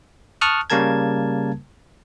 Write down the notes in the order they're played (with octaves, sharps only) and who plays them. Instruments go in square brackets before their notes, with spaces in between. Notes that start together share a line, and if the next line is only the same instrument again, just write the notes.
[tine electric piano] A5 C#6 D#6 F6 F#6
C#3 G3 A#3 A#4 A5 G#6